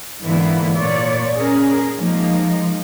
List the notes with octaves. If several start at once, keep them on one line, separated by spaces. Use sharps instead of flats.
G#2 D3 E3 A#3 B3 E4
A#2 C#5 D5
C#4 G#4 A#4
F3 G#3 A#3 D#4